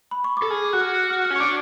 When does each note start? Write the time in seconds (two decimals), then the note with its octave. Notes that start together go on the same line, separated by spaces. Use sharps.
0.11 B5
0.24 C#6
0.37 D6
0.42 A4
0.50 G#4 F6
0.65 D6
0.73 F#4 F#6
0.81 F6
0.95 F#6
1.10 F6
1.25 F6
1.31 C#4
1.36 C#6
1.40 D4 D6